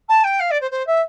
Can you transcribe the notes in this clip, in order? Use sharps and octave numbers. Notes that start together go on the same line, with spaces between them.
A5
G5
F5
D5
C5
C5
E5